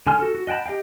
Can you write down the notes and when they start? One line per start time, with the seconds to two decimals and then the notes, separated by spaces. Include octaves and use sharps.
0.07 D3 G#5 C6 F6
0.19 F#4 A4
0.35 F#4
0.47 D#5 F#5 G5 A5 B5
0.66 G4 D#5 F5 G5